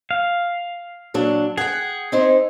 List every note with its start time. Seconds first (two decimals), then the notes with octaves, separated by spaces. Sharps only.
0.11 F5
1.14 A#2 F#3 D4
1.58 G#4 F#5 G5
2.12 C4 D#4 C5